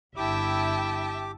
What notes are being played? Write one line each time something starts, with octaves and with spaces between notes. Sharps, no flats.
G1 E4 G4 E5 G5 A5 D6